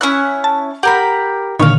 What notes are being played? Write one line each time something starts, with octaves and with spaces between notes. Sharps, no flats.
C#4 E4 F#6
A5
G4 A#4 F#5 B5
A#2 D3 D#3 C#5 F5